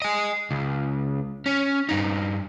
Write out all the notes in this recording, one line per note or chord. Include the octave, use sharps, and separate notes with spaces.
D#5 G#5
C#2
C#4
G2 D#4